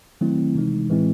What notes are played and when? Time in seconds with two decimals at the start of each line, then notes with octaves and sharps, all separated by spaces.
0.21 D#3 F#3 A3 C4 E4
0.55 C3 E3 G#3 D#4
0.89 A2 E3 G#3 C4 E4